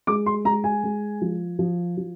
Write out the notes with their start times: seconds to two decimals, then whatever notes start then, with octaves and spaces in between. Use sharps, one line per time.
0.07 G#3 D6
0.26 C6
0.45 G#3 A#5
0.64 G#5
0.84 G#3
1.21 F3
1.59 F3
1.97 F3